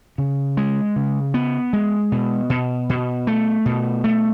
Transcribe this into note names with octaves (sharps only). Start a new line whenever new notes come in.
C#3
G#3
C#3
B3
G#3
B2
B2
B2
A3
B2
A3